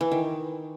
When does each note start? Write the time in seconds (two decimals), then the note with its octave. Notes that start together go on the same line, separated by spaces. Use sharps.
0.01 E3
0.12 D#3